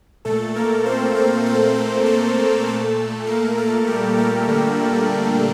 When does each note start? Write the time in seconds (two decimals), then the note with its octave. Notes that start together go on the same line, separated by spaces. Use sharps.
0.25 A#2 A3 A4
0.56 A#3 A#4
0.86 C4 C5
1.15 A#3 A#4
1.46 A3 A4
1.76 A3 A4
2.06 A3 A4
2.67 A#2 A3 A4
3.27 A#3 A#4
3.58 A3 A4
3.87 G3 G4
4.17 A#3 A#4
4.48 D3 D4